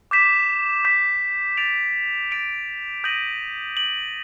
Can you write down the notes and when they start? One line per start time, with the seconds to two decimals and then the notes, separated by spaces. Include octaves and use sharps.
0.11 D6 G6 B6 E7
0.84 D6 G6 B6 E7
1.57 A6 D7 F7
2.31 A6 D7 F7
3.04 D#6 G6 A#6 D#7 F#7
3.77 F#7